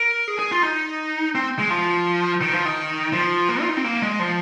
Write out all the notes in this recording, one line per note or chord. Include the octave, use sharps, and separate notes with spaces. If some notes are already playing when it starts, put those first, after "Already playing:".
Already playing: A#4
G#4
G#4
F4
D#4
C4
G#3
F3
D#3
F3
D#3
F3
A#3
F4
D#4
C4
A#3
G#3
F3